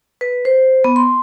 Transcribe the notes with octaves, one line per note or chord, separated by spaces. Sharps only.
B4
C5
B3
C6